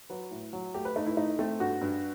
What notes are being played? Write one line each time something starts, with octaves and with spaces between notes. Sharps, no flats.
F#3 B4
A2
F#3
A3 G4
B4
A3 D#4
E4
A3 D#4
A3 C4
G2 F#4
G2